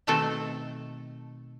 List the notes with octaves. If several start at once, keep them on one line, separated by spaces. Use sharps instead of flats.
B2 D#3 A3 C4 A4